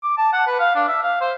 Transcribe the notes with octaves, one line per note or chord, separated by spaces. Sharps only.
D6
A5
F#5
B4
F5
D4
E5
F5
C5